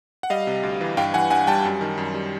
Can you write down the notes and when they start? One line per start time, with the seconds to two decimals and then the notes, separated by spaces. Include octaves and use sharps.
0.23 F#5
0.30 G3 D#5 F5
0.47 C3
0.63 D2
0.81 E3
0.97 G2 F5 G5
1.14 E3 F#5 G#5
1.30 G2 F#5 G#5
1.47 G3 G5 A5
1.65 F#2
1.81 D#3
1.98 F#2
2.14 G3